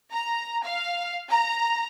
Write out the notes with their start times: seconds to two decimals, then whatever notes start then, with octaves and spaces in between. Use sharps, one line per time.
0.11 A#5
0.63 F5
1.30 A#5